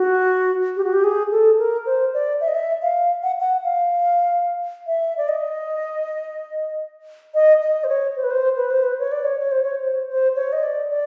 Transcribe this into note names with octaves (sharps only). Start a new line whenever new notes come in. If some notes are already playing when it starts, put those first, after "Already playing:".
Already playing: F#4
G4
F#4
G4
G#4
A4
A#4
C5
D5
E5
D#5
E5
F5
F#5
F#5
F5
E5
D5
D#5
D#5
D#5
C5
C#5
C5
B4
C5
B4
C5
B4
C#5
D5
C#5
C#5
C5
C#5
C5
C5
C#5
D#5
D5
D5